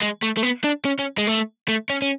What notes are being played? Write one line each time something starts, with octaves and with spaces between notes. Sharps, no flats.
G#3
A3
A3
B3
D4
C#4
C#4
G#3
A3
A3
C#4
C#4